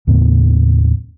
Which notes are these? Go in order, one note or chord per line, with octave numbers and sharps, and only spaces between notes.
D#2 A2 C#3 B3